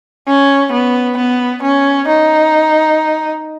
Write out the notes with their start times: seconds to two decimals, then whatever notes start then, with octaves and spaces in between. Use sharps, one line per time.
0.28 C#4
0.72 B3
1.17 B3
1.63 C#4
2.08 D#4